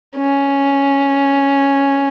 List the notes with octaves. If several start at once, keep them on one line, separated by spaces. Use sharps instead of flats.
C#4